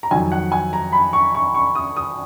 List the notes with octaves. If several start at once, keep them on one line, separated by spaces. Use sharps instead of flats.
A#5
F2 D#3 F#3 G#5
F#5
G#5
A#5
B5
C#6
C#6
C#6
D#6
D#6